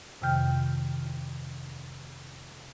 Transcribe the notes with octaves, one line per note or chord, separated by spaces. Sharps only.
F2 C3 D#3 G5 F6 G6